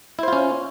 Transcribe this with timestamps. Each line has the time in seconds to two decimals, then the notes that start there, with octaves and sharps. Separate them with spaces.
0.19 E4
0.23 C5
0.28 F4
0.33 C#4